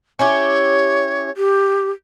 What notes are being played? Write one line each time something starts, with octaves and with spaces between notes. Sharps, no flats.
C#4 E4 G4 C#5
G4